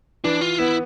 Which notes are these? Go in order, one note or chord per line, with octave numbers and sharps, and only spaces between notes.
E3 D4
F4
B3 E4